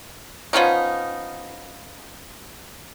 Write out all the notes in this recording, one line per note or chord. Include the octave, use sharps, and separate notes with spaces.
F3 B3 C#4 D#4